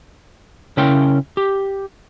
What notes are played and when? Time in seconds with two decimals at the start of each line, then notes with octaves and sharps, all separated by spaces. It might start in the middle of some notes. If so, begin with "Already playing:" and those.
0.77 C#3 C#4 E4 A#4 G5 C6
1.37 G4